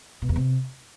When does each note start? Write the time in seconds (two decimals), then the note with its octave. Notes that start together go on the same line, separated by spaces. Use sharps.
0.22 B2
0.29 E2
0.36 C3